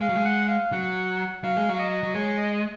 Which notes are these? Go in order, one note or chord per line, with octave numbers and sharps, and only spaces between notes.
G#3 F5
F#3
G#3
F#5
F5
F#3 F#5
F#3 F5
G#3
F#3 F5
D#5
F#3
G#3 C#5
D#5
D#5